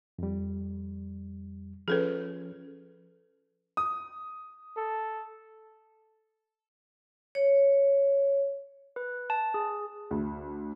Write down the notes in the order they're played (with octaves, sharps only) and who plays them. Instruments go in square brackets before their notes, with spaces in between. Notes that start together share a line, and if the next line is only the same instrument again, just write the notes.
[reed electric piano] F2 G3
[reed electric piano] F3 C#4 [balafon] G#4 A4 B4
[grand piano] D#6
[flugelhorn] A4
[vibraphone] C#5
[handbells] B4
A5
G#4
[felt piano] D2